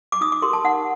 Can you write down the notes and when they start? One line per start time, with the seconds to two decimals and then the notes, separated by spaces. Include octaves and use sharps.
0.12 D6
0.21 D#4 D#6
0.32 D6
0.42 G4 A#4 C6
0.53 A5
0.64 D#4 F#5